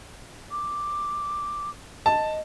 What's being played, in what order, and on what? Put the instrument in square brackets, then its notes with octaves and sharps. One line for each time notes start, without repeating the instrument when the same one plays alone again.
[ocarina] D6
[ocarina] D#5 [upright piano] A5